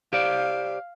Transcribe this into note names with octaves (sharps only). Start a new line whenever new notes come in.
G4 C5 D5 F5